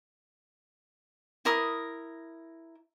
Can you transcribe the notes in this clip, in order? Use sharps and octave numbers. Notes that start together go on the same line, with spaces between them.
E4 A#4 D#6